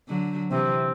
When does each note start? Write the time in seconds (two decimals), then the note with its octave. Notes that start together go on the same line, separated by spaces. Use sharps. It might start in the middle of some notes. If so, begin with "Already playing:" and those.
0.09 D3 F#3
0.51 C3 E3 C4